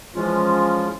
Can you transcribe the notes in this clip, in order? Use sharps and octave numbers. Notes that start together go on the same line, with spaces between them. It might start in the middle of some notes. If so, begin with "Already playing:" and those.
E3 F3 G#3 C#4 F4